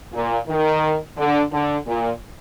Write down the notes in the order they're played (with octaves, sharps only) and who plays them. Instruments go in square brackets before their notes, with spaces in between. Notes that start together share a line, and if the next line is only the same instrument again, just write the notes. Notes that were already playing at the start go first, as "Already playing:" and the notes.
[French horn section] A#2
D#3
D3
D3
A#2